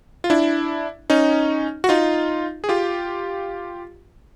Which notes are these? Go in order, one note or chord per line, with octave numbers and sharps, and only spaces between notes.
F4
D4 E4
C#4 D#4
F#4
D#4 F4
G#4
F4 G4